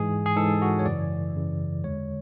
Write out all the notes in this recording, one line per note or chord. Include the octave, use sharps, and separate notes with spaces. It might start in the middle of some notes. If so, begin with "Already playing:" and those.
Already playing: G#2 E3 G#3 G#4
G#4
G#2 E3 G#3 A4
F#4
C#5
F#2 C#3 E3 D5
F#2 C#3 E3
E2 D3 G#3 C#5